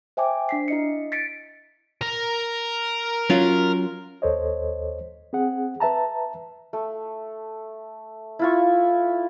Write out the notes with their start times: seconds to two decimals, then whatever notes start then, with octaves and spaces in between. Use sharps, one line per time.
0.17 C5 E5 G5 G#5 D6
0.49 D4 B6 C7
0.68 E4 D#5 C#7
1.12 A6 B6 C#7 D7
2.01 A#4
3.30 F#3 C#4 F4
4.22 D#2 A4 C5 C#5 D#5
5.33 C4 G#4 F#5
5.80 B4 E5 A5 A#5
6.73 A3
8.39 E4 F4 C#6